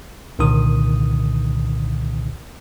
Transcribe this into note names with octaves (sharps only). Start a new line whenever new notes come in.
C2 A#2 D3 D#3 D#6